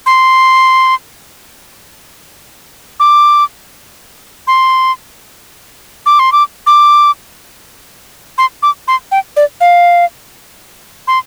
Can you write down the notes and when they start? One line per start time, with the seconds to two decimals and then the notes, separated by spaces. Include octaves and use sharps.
0.06 C6
3.00 D6
4.47 C6
6.06 D6
6.19 C6
6.32 D6
6.67 D6
8.38 C6
8.63 D6
8.88 C6
9.12 G5
9.37 D5
9.61 F5
11.08 C6